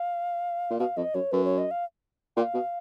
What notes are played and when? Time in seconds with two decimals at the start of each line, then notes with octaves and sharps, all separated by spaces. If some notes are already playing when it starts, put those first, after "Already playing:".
Already playing: F5
0.71 A#2
0.79 B2 F5
0.97 F2 D#5
1.14 F#2 C#5
1.32 F#2 B4
1.45 C#5
1.58 D#5
1.71 F5
2.37 A#2 G5
2.42 F5
2.54 B2